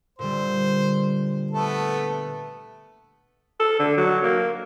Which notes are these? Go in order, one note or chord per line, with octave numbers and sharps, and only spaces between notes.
A#2 D3 G3 C5
A3 B3 A4
A4
D3
F#3
A#3